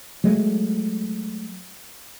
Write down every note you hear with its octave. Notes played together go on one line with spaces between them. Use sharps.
F#3 G#3 A3